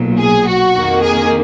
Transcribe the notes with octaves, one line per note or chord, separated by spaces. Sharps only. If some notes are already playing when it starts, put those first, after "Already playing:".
Already playing: B1 A#2 F#3
G#4
F#4
F2 D#3 A#3
G#4